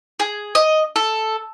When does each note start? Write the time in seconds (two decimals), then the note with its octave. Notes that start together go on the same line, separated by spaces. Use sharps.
0.20 G#4
0.55 D#5
0.96 A4